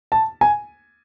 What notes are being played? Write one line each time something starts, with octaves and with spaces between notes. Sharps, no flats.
A5
G#5